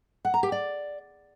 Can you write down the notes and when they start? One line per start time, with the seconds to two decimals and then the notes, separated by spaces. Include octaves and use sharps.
0.25 F#5
0.34 A#5
0.43 G4
0.52 D5